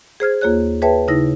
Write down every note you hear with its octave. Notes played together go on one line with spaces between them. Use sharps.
G#4 C5 F6 G#6
D#2 A#3 F4 G#4 C#5 F#6
G#4 B4 C#5 E5 G5 A5
C#3 D#4 E4 A#6